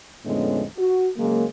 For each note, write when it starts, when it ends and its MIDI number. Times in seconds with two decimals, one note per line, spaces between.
0.26 0.64 41
0.26 0.64 45
0.26 0.64 50
0.26 0.64 56
0.26 0.64 59
0.26 0.64 61
0.78 1.08 66
1.18 1.45 49
1.18 1.45 54
1.18 1.45 56
1.18 1.45 58